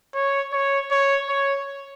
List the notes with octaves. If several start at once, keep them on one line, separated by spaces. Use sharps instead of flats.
C#5
C#5
C#5
C#5